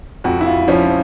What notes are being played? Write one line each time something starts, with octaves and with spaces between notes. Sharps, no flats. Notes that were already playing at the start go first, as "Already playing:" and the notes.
F2 F#4
E4
F4
F3 C#4